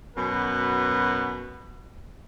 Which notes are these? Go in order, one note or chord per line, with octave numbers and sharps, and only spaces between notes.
F#2 B2 B4